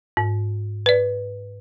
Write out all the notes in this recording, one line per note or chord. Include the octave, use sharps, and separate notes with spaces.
G#2
B4 D5